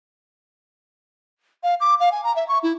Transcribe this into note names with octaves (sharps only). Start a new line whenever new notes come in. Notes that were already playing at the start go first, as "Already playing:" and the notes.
F5
D6
F5
G#5
A#5
E5
C#6
E4